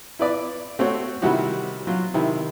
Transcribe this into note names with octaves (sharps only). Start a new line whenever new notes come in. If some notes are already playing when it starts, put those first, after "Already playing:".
E4 B4 D5
A3 C4 F#4 C#5
C3 D#3 G3 E4 F#4 G4
F#3 F4
C3 D#3 E4